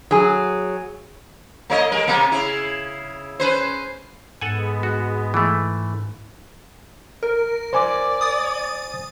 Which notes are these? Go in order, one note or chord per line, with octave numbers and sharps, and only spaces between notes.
F#3 G#4
A3 C#5 D#5
G3 A#4
C3 A#3 B3
C#3 E4
C#4 B4 C5
G#2 G#3 B3 A4 F#5 G#5
F#4
E3 A3
A#4
C5 D5 G#5 D6
D#6 A6